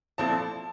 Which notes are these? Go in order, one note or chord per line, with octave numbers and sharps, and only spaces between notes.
A#2 F3 C4 E4 A4 A5